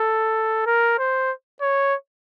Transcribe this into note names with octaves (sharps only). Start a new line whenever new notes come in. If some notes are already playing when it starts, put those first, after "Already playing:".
Already playing: A4
A#4
C5
C#5